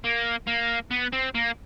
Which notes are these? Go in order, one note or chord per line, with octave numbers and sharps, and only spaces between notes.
A#3
A#3
B3
C4
A#3